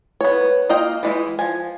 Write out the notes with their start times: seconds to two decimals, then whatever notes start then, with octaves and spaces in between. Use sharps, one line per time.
0.21 B3 C#5
0.69 A#3 F4 D#5 G5
1.03 E3 G#3 E4
1.39 F3 G#5